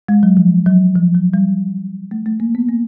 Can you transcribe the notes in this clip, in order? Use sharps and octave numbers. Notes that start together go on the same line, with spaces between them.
G#3
F#3
F3
F#3
F3
F#3
G3
A3
A3
A#3
B3
A#3